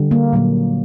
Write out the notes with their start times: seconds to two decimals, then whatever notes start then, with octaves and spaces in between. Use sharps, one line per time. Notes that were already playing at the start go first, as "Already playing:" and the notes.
Already playing: D3 G3
0.11 A#3
0.33 A#2 F#3 A#3